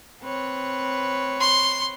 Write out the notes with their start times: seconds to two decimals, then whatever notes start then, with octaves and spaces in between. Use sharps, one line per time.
0.23 C4 B4 C#5
1.41 C6